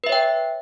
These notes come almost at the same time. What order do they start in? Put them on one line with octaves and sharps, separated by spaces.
B4 E5 C#5 G5